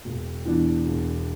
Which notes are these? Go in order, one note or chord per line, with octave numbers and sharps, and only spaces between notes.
E1
E2 E3 D4
E1